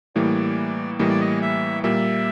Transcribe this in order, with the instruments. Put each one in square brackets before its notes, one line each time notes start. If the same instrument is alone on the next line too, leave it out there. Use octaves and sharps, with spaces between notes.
[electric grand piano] A2 E3 G3 A#3 [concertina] D5
[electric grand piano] A2 E3 G3 A#3 [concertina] D#5
[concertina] D5
D#5
E5
[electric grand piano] A#2 G3 A#3 [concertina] E5